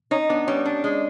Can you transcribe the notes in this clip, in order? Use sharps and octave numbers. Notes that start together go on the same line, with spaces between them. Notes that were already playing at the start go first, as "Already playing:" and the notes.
C#4 D#4 C#5
B3 D4 D5
G3 C#4 C#5
D4
G#3